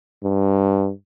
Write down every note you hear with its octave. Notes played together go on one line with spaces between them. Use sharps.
G2